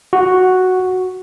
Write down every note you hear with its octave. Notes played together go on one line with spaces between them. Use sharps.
F#4